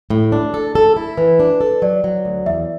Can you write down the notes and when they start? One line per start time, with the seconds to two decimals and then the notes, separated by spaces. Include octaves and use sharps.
0.10 A2
0.32 D4
0.54 A4
0.75 A4
0.96 E4
1.17 E3 B4
1.40 D4
1.61 A4
1.82 F#3 D5
2.04 F#3
2.25 D2
2.46 E2 E5